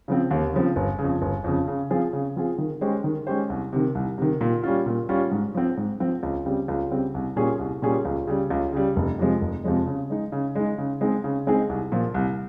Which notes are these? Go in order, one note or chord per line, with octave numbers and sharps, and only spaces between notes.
C#3 F3 C4
D#2
C#3 F3 C4
G1
C#3
F2
G1
F2 C#3
C#3
F3 C4 F4 G#4
C#3
F3 C4 F4 G#4
D#3
G#3 C#4 G4 C5
D#3
G#3 C#4 G4 C5
C2
C3 D#3
C2
C3 D#3
A#2
G3 C#4 F4
A#2
G3 C#4 F4
G#2
F3 C4
G#2
F3 C4
C#2
C#3 G3 C4
C#2
C#3 G3 C4
C2
A#2 G3 C#4 G#4
C2
A#2 G3 C#4 G#4
C#2
C#3 G3
C#2
C#3 G3
F1
F2 C3 F3 G#3
F1
F2 C3 F3 G#3
C#3
G#3 D#4
C#3
G#3 D#4
C#3
G#3 C4 D#4 G#4
C#3
G#3 C4 D#4 G#4
C2
A#2 F3
C2